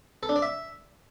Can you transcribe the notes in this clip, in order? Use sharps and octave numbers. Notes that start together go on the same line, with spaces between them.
A4
D4
D5
E5